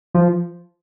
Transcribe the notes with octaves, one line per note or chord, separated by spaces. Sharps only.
F3